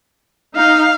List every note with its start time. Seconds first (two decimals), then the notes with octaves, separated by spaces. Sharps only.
0.56 D#4 F5